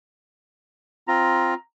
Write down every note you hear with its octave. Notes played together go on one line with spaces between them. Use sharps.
C4 F4 A#5